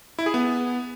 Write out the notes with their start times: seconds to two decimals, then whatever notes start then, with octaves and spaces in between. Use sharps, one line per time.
0.19 E4
0.26 G#4
0.34 B3